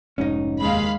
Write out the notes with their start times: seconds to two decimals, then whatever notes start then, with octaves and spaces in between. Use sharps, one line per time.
0.18 F1 G#2 C#4 D#4
0.60 D#2 G#3 F5 B5